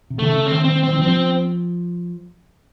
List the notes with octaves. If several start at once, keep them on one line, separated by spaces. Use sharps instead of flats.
C3
D#3 A3
C#3
D#3 C4
C4
C4
D#3
F3 C4